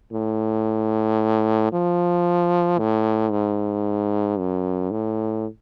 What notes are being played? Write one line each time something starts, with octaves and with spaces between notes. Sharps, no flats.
A2
F3
A2
G#2
F#2
A2